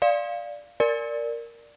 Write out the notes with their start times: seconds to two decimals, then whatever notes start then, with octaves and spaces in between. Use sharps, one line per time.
0.02 D5 F5
0.80 A#4 D5